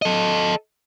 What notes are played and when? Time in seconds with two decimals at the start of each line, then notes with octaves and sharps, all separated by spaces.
0.02 A4 D#5